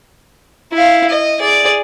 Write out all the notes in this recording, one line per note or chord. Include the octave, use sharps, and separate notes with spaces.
E4 F5
D#5
G#4 D5